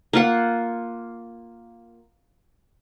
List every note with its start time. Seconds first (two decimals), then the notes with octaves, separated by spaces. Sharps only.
0.13 A#3 F4 F#5